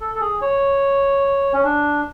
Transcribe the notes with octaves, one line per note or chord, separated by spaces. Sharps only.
A4
A4
G#4
C#5
C#4
D4